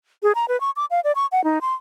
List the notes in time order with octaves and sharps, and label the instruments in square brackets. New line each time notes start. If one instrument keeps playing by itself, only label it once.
[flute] G#4
A#5
B4
C#6
D6
F5
D5
C#6
F#5
D#4
C6